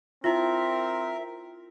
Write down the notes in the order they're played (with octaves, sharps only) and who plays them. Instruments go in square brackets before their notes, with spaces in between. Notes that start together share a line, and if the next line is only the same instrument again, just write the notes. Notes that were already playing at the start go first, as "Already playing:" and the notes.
[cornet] C4 [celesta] E4 F4 [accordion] A#4 [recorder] E5